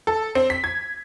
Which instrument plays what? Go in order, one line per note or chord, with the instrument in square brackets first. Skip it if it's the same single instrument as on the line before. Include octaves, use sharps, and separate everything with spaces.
[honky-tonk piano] A4
C4
B6
G#6